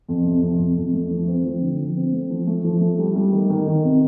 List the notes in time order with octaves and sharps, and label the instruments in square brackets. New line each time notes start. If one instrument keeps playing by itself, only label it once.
[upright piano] F2
C3
F2
F2
F2
A3
F3
C4
F3
D3
F3
C4
A3
F3
A3
F3
A3
G3
G3
D#3
D#3
D#3
C3